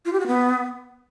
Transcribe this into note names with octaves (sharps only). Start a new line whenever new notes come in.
F4
G4
F#4
B3